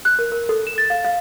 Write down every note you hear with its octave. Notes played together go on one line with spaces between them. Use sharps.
F#6
A#4
A#4
A4
E7
A6
F5
F5